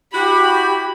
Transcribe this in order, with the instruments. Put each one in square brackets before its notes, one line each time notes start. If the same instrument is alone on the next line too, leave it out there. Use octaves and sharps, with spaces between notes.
[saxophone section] E4 F#4 [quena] G4 [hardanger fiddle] B5